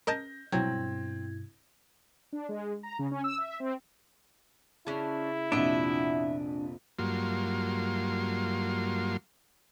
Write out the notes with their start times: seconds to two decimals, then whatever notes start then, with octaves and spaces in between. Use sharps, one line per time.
0.07 C#4 A#4 D#5 A5 G6 A#6
0.52 G2 B2 F#3 C4 E4 G#6
2.33 D4
2.49 G#3
2.83 A#5
2.99 C#3
3.11 C#4
3.24 E6
3.38 E5
3.60 C4
4.87 C#3 C#4 D4 E4
5.52 A#1 F2 C3 B3 D4 D#5 E5
6.99 G2 F#3 A#3 F4 C6